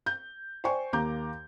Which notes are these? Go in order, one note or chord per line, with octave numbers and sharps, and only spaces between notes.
G6
C5 D5 G5 G#5 C#6
D#2 A#3 A#5 D6 G6